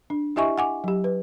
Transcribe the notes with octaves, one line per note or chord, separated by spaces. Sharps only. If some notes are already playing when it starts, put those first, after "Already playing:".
D4
E4 G4 D#5 E5 G#5 C#6
F#5 G#5 D6
F#3 G4
B4